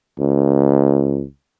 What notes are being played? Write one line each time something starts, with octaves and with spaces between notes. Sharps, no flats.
C#2